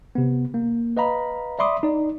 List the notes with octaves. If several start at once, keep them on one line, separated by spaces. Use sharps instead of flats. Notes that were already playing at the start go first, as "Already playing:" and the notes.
C3 B3
A#3
B4 D#5 F5 A#5 B5
D5 E5 B5 C6 D6 D#6
D#4 D5